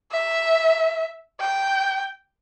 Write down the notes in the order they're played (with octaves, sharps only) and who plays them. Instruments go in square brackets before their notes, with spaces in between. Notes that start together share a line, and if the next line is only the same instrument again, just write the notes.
[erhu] E5
G5